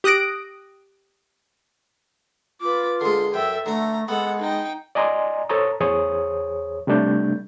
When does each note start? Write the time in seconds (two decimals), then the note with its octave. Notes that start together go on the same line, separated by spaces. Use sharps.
0.04 G4 D#6 F#6 A#6 D7
2.61 F4 B4 D6
3.01 D3 G#3 C6
3.34 F#2 A4 E5 G5
3.66 D3 A3 F#4 A#5
4.08 G#3 B3 A4 F#5
4.39 D#4 G5
4.95 D5 D#5 G#5 A#5 C6
5.49 A4 C5 C#5 A5 A#5 D#6
5.80 E2 G#4 C5 C#5 D#6
6.87 C3 G3 A3 D4 G6